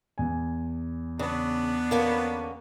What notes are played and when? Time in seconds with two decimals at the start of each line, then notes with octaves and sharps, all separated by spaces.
0.18 E2 G#5
1.19 C#3 B3 D4
1.91 D3 A#3 C#4